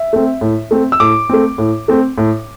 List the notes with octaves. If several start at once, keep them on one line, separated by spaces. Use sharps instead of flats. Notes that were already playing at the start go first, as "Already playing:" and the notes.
Already playing: E5
A3 C4
A2
A3 C4
E6
A2 D6
A3 C4
A2
A3 C4
A2